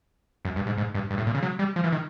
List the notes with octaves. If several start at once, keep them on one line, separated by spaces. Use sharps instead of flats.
F#2
G2
G#2
G#2
G2
G2
A2
A#2
C#3
F#3
G3
F3
E3
D#3